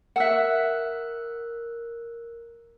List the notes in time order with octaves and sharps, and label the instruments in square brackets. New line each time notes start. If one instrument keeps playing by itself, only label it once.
[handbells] A#4 E6 F#6 [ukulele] E5 F#5